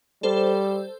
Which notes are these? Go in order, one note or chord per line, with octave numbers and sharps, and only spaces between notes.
G3 A4 C5